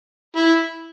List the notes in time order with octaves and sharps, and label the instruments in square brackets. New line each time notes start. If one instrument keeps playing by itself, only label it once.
[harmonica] E4